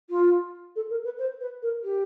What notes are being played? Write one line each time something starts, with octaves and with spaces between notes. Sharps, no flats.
F4
A4
A#4
B4
C5
B4
A#4
G4